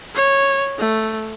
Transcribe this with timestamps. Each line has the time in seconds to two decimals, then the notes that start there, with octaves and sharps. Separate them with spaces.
0.15 C#5
0.78 A3